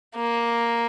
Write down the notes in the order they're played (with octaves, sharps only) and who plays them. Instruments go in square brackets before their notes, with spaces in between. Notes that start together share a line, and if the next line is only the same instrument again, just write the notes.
[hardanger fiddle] A#3